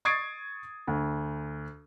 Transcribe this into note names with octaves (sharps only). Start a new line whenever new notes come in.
C#6 D#6 G#6 A6 C7 D7
D2